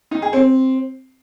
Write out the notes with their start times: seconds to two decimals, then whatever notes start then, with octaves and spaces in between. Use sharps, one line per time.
0.11 D#4
0.22 G#4
0.33 C4